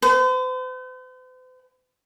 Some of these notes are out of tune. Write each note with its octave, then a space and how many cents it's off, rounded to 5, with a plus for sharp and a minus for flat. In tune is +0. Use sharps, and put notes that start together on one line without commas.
C5 -45